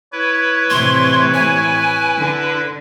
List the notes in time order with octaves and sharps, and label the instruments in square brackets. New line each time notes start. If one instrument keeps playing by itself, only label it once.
[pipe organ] E4 B4 [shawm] C#5
[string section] A2 C3 E3 [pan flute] C6
[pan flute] G#5
[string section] D3